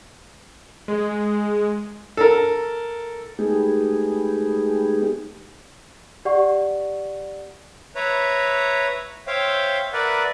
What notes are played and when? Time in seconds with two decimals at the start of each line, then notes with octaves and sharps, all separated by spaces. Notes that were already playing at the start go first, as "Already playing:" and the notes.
0.88 G#3
2.17 A4 A#4
3.39 G#3 A3 B3 D#4 G4 G#4
6.25 G4 D5 F#5 C#6
7.96 B4 C#5 E5 A#5
9.27 C5 C#5 E5 F5 G5
9.93 A#4 B4 D5 E5 F#5